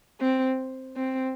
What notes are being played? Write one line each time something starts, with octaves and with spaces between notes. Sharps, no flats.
C4
C4